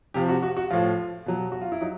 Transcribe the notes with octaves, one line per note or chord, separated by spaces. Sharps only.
C3 F3 G4
F#4
F#4
F#4
A2 F3 F4
B2 F#3
F#4
F4
E4
F#3 D#4